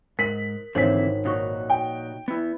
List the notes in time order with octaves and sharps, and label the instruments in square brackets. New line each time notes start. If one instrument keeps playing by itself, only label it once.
[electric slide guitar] G#2 [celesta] A#4 F#7 [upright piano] B6
[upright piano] G#1 B6 [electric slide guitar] D3 E3 C4 [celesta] C5 C#5 F#7
[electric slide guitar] A#2 D#4 F#4 [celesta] C#5 C#6
[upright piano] G5
[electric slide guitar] B3 E4